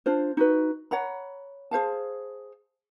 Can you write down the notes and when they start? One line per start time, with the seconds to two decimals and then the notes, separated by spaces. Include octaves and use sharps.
0.06 D4 F4 C5
0.37 D#4 F#4 B4
0.91 C#5 F#5 A#5 B5
1.71 G#4 C5 F5 A5